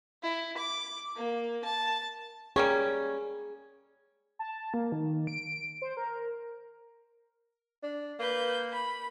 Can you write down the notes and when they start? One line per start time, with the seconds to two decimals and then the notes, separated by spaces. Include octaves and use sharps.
0.23 E4
0.58 D6
1.16 A#3
1.64 A5
2.56 G3 A#3 C#4 G#4
4.39 A5
4.74 A#3
4.92 D#3
5.27 D7
5.82 C5
5.97 A#4
7.83 D4
8.19 A#3 B4 G6
8.73 B5